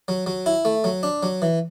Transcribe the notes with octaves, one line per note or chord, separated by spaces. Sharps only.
F#3
F#3
E4
A3
F#3
D4
F#3
E3